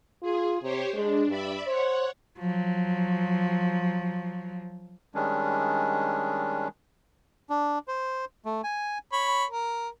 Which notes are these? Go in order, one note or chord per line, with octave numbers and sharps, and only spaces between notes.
F4 G#4
C3 G4 C5 C#5
G#3 D4
G2 D5 E5 B5
C5 C#5 F#5
F3 F#3
D#3 G3 G#3 C#4 D4
D4
C5
A3
G#5
C#5 B5
A#4